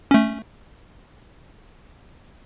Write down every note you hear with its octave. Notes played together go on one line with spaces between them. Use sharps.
A3 C#4